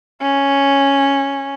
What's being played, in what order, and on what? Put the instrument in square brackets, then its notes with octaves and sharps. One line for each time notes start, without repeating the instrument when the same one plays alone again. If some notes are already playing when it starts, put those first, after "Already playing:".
[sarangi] C#4